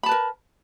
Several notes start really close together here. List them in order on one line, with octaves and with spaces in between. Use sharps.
B5 A5 B4 A#4